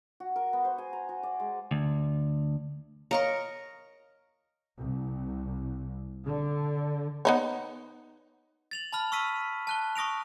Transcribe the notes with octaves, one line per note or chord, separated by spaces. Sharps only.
F#4
A#4
B3
C5
G#5
A#5
F#4
D5
G#3
D2
A#4 C#5 D#5 F5 A#5 C#6
C2
D3
B3 D#4 C#5
A6 F7 F#7
A5 B5 F6
C#6 E6 F6 B6 D#7
A5 F#6 G7
C#6 D#6 A#6 D7 F7